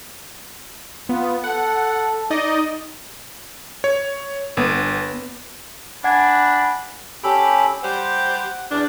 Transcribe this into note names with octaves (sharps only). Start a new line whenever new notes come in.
B3 F4
A4 F#5
D#4 D5 D#5
C#5
G1 B3
D4 F#5 G#5 B5 G#6
C#4 G4 A4 B5
G3 G4 C5 F#5
E2 D4